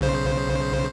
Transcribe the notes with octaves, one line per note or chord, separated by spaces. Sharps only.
B1 C#3 C5